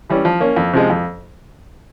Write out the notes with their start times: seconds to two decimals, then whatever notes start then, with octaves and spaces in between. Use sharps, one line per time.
0.09 E3 G3 C#4
0.25 F3
0.40 A#3 C#4
0.56 F2
0.73 C3 F3 G#3
0.90 F2